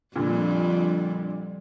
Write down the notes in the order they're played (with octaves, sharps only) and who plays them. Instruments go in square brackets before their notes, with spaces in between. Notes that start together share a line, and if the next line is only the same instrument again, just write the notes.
[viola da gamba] F2 G3 [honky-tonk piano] A#2 D3